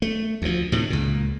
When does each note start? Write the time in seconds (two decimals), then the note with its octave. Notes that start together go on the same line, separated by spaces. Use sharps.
0.02 A3
0.42 D2 F3
0.72 A2 C3 D#3
0.90 C#2 A#2